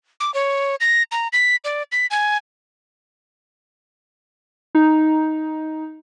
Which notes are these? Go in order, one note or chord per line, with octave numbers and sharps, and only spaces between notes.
D6
C#5
A#6
A#5
B6
D5
B6
G#5
D#4